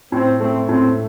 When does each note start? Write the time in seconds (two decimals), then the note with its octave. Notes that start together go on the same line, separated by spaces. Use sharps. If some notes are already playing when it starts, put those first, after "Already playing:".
0.12 A2 C4
0.40 A3 C4
0.68 A2 C4